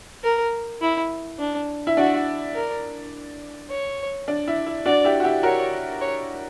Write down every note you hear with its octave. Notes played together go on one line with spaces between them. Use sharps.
A#4
E4
D4
E4
D4 F#4
A#4
C#5
D4
E4
E4
D4 F#4 D5
E4 G4
F#4
E4 G4
F#4 A#4 C#5
C#5